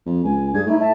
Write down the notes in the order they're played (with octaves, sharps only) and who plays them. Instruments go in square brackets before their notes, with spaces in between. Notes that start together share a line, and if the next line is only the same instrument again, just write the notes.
[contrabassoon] F2
[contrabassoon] C#2 [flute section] G#5
[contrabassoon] G2 [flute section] G#4 G#6
[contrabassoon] A2 [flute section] D#4 E4
[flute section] E5 A5